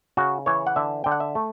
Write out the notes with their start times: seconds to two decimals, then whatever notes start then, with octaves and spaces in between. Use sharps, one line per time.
0.17 C#3 F#4
0.46 E3 C#5
0.67 F#5
0.76 D3 E5
1.04 D3 G5
1.12 F#5
1.20 E5
1.35 A3